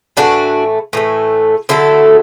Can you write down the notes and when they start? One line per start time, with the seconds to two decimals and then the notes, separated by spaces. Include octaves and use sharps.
0.17 A2 E3 A3 D4 F#4
0.93 A2 E3 A3
1.69 D3 F#3 A3 E4 A4